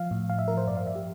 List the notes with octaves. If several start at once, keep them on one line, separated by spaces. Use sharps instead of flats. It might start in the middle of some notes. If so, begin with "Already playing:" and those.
Already playing: F3 F5
A2
F3 F5
E5
F3 A#4
C5
G2 D5
F5
F3 E5
G4